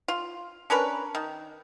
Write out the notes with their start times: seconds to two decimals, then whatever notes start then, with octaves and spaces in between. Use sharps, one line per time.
0.08 F4
0.70 C#4 D4 A#4 B4
1.15 D#3